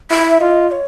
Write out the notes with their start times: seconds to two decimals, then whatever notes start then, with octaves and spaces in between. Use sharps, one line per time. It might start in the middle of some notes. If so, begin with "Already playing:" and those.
0.11 E4 E5
0.41 F4 D#5
0.71 C#5